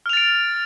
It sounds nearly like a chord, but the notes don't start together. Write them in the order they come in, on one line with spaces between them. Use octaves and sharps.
F6 F7 A6 D7